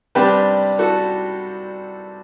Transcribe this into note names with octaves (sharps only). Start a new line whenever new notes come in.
C3 G3 D4 G4 B4
F#4 A4